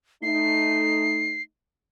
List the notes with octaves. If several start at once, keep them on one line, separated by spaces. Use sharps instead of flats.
A3 D#4 C7